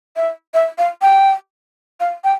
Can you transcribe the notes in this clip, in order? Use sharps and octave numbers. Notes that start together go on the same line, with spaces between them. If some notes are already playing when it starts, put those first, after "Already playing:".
E5
E5
F5
G5
F5
G5